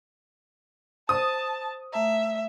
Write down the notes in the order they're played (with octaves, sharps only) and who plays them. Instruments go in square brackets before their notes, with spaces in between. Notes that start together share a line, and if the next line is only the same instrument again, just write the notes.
[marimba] C5 [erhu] A5 [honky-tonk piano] D#6
[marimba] A3 A5 A#5 [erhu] E5